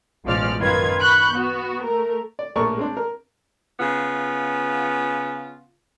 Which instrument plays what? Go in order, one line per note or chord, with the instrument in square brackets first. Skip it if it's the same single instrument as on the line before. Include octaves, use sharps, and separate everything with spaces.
[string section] A1 B2 F3 G#3 D5 F6
F#2 D#3 F4 B4 G#6
B5 C#6 F#6 G6
B3 F#4
A3 A#4
[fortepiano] D5
A#1 A2 A3 A#4 D5 C#6
G#3 C4 D4
A#4
[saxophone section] C#3 B3 F4